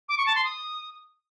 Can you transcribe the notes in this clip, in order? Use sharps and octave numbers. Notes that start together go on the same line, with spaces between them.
D6
C#6
A5
C6
D#6